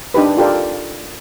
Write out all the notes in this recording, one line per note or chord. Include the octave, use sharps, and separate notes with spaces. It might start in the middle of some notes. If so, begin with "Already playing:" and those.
D4 D#4 G4 B4
F4 G4 A4 A#4 D5